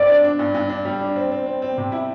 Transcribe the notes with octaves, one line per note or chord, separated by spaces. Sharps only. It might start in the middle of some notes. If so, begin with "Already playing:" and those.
Already playing: G2 C4 D5
D4
D4
G2
G2
D4
G3
D4
C4
C4
C4
C4
C3
E4